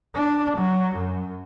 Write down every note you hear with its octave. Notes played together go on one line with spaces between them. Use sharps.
D4
F#3
F#2